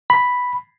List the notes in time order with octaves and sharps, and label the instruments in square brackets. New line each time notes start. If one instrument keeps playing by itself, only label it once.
[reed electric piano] B5